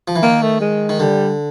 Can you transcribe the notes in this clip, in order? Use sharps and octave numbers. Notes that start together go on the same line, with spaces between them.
F3
E3
D#3 A#3
A3
G#3
D#3
D3 G3